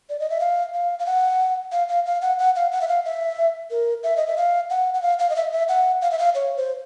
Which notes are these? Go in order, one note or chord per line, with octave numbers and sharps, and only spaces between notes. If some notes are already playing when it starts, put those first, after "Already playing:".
D5
D#5
E5
F5
F5
F5
F#5
F5
F5
F5
F#5
F#5
F5
F#5
E5
F5
E5
A#4
E5
D#5
E5
F5
F#5
F#5
F5
F5
D#5
E5
E5
F#5
F5
E5
F5
C#5
C5